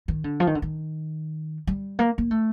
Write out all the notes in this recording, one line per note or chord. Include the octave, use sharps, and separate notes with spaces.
D#3
D3
F3
D#3
D3
D#3
G3
A#3
A#3
A3